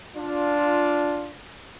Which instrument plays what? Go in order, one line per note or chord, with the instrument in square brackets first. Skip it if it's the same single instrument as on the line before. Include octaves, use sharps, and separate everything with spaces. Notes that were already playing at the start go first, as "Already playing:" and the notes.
[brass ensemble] D4 F4